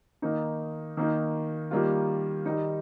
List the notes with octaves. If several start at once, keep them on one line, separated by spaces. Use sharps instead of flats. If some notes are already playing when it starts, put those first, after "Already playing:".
D#3 A#3 D#4
D#3 A#3 D#4
D#3 G3 A#3 F4
D#3 G3 D#4